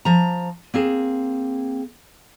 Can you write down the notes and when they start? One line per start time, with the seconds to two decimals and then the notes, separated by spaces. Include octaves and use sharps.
0.05 F3 A#5
0.74 A#3 C4 G#4